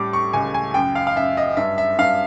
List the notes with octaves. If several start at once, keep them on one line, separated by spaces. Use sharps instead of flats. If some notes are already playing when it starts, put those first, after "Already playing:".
Already playing: A2 G3 C#4 D6
C#6
C#2 G#5
G#5
F#2 G5
F5
F5
F#2 E5
D#5
G2 E5
E5
G2 F5